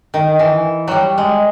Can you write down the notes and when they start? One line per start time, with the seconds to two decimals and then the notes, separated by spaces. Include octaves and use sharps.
0.14 D#3
0.39 E3
0.88 F#3 G3
1.18 G#3